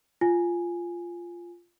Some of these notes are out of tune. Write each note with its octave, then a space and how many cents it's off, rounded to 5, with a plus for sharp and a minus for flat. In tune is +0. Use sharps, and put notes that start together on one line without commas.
F4 -10 G#5 +0